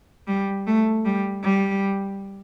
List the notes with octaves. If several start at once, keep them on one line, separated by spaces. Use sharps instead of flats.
G3
A3
G3
G3